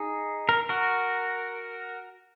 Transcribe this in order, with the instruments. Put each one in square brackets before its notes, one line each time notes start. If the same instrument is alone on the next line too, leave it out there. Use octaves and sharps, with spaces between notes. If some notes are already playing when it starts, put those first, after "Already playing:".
Already playing: [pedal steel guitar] D#4 G#4
A#4
F#4 A#4